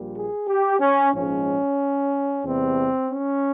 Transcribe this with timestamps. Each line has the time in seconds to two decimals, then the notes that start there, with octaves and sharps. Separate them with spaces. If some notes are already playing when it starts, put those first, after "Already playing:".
Already playing: A#1 A#2 G3
0.15 G#4
0.48 G4
0.80 C#4
1.13 A#1 G#2 F3 G#3 C#4
2.44 E2 C3 G3 C4
3.10 C#4